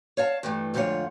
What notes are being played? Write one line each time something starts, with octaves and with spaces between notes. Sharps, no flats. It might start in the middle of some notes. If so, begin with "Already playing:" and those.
C#5 F5 A5
G2 E3 A3
F2 G#2 D3 F3 F4 C#5